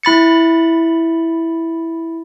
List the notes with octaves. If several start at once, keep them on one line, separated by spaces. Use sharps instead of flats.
E4 B5 A6 C#7